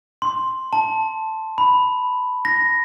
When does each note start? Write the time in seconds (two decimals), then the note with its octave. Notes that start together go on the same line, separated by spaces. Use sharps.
0.22 C6
0.73 A5
1.58 B5
2.45 A#6